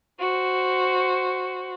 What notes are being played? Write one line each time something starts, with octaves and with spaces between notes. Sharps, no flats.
F#4 C5